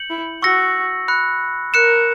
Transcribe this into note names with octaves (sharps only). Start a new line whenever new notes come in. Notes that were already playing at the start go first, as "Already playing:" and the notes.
Already playing: G6 C#7 F#7
E4
F#4 C#6 E6 A#6 C#7
B5 F#6 C#7
A#4 F#6 C#7 E7